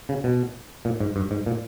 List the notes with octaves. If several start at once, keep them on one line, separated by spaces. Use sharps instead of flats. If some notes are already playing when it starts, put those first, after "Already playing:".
C#3
B2
A#2
G#2
G2
G#2
A#2